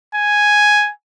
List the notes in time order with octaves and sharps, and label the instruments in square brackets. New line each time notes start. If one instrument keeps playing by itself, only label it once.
[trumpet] G#5